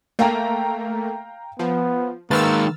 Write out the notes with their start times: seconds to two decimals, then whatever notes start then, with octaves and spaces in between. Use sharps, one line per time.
0.19 A3 A#3 F5 G5 A#5
1.59 F3 B3
2.31 D#3 G#3 A#3 B4 E6 F6 A6